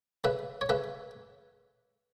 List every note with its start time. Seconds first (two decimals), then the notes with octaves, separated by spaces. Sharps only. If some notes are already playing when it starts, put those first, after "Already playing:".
0.24 C#3 B4 E5
0.61 C#5
0.69 C#3 B4 E5